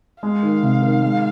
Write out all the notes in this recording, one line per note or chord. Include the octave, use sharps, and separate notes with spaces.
G#3 F5
D#3
C3
D#3
G#3